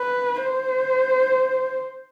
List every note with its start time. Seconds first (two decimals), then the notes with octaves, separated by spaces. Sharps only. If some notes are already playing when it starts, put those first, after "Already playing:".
Already playing: B4
0.43 C5